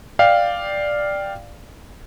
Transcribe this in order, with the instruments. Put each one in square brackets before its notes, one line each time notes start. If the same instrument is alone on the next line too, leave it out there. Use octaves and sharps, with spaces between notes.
[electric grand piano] D5 F5 G5